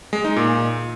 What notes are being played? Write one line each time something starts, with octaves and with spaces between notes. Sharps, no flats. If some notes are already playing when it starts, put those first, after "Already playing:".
G#3
D#4
A#2